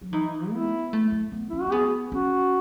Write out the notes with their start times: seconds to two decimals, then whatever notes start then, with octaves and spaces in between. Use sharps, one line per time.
0.01 F#3
0.13 E3 D#4
0.52 B3 E4
0.93 A3
1.12 A3
1.32 B3
1.50 C#4 E4
1.61 F#4
1.67 C#4
1.72 B3 G#4
2.12 C#4 F#4